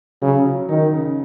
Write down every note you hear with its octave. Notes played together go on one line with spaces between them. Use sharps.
C#3 F#3
F#3
D#3 D#4
C#3